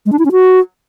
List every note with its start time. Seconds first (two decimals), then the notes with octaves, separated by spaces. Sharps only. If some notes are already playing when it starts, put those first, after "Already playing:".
0.06 G#3
0.12 D4
0.19 E4
0.25 C#4
0.32 F#4